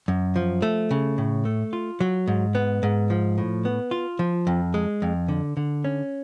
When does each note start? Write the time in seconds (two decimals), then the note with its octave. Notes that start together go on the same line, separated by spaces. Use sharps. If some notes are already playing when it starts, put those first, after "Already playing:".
0.08 F#2
0.36 F3
0.62 A3
0.91 C#3
1.18 A2
1.45 A3
1.73 F4
2.01 F#3
2.27 G#2
2.55 B3
2.83 G#2
3.10 F3
3.38 A2
3.65 B3
3.91 F4
4.19 F3
4.47 F2
4.74 G#3
5.02 F2
5.28 D3
5.57 D3
5.84 C#4